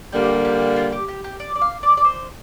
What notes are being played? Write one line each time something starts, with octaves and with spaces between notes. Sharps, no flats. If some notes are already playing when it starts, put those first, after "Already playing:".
D3 G3 A#3 G4
G4
F4
G4
G4
G4
D5
D5
F5
D5
D5
C5